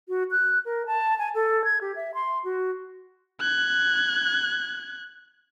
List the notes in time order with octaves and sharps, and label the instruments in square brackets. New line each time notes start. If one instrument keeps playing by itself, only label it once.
[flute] F#4
F#6
A#4
A5
G#5
A4
G#6
G4
E5
C6
F#4
[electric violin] F#6 G#6